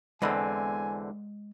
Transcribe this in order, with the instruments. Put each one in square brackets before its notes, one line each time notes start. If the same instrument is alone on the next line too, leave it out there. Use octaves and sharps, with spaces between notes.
[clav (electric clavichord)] E2 D3 C4 [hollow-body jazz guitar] G#3 D#5 B5 [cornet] G#5